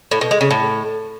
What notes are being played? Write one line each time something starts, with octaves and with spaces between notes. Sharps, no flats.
A2
B2
G#3
C#3
A2